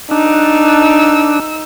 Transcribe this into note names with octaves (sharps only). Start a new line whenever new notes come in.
D4 D#4 E6